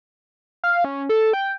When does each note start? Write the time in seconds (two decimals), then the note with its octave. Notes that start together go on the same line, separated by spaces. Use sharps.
0.64 F5
0.84 C#4
1.09 A4
1.33 G5